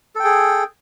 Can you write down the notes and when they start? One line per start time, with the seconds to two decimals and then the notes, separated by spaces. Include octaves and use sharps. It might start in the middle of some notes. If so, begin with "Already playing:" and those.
0.15 A4
0.20 G5
0.24 G#4